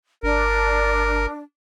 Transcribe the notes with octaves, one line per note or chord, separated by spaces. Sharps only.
G1 D4 A#4